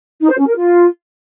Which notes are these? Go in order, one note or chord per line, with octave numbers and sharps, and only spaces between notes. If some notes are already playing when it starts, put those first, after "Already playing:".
D#4
C5
C#4
A#4
F4